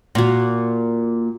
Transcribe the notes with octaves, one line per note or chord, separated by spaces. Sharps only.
A#2 F#4 A#5